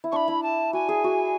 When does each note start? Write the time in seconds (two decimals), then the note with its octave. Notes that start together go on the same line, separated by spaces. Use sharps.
0.04 E4
0.12 D4 B5 C#6
0.28 E4
0.43 A5
0.73 F#4 G#5
0.89 G#4
1.04 F#4